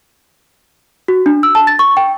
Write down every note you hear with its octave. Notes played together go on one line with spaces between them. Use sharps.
F#4
D4
E6
A5
A6
C#6
G5